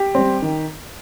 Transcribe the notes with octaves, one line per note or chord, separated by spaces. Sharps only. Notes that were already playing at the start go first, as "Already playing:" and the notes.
Already playing: G4
G3 C4
D#3